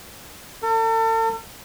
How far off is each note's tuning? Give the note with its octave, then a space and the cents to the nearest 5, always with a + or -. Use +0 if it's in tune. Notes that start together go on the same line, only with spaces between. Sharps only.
A4 +40